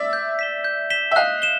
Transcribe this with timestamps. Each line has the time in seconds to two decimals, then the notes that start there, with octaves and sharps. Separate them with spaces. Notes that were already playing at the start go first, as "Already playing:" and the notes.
Already playing: D5 E5
0.13 G6
0.39 B6 E7 G7
0.64 G6
0.90 B6 E7 G7
1.11 E5
1.16 D#5 F5 F#6
1.42 E7 G7